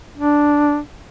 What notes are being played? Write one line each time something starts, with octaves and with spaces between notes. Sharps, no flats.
D4